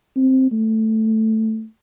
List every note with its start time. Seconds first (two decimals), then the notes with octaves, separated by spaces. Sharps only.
0.16 C4
0.52 A3